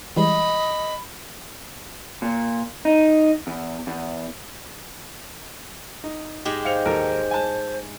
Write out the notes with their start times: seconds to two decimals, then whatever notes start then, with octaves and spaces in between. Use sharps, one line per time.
0.16 E3 G3 G#3 D#5 B5
2.22 A#2
2.85 D#4
3.47 E2
3.87 E2
6.04 D#4
6.45 G#2 G#3 G4
6.65 C5 F5 C#7 F7
6.86 D#2 A4 A#4
7.31 G#5 A5